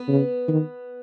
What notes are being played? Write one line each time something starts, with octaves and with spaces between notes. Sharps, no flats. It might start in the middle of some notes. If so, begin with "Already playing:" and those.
Already playing: B3
C#3
D#3